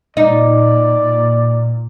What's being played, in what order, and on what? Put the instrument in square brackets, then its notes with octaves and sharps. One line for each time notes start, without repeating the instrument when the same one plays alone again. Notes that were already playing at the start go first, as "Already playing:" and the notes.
[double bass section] A#2 [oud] D#4 [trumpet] D5